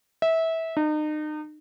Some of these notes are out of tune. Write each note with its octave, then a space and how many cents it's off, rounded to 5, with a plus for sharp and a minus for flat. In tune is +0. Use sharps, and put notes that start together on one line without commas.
E5 -20
D#4 -35